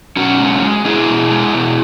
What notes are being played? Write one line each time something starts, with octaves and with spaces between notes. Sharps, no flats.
B2 C#4 F#4
G#3
G#3
G#3 E4 G#4
B2
G#3
B2